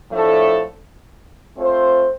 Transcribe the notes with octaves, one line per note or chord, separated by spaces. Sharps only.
A2 F3 A3 D4 A4
A3 C4 F4 C5